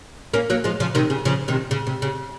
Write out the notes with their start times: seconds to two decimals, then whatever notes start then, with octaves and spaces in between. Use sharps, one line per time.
0.34 A#3 C#4
0.50 F#3 A#3
0.64 F3 G#3
0.80 C#3 F3
0.95 C3 D#3
1.10 C#3
1.25 C#3 F3
1.48 C3 D#3
1.71 C#3
1.87 C3
2.02 C#3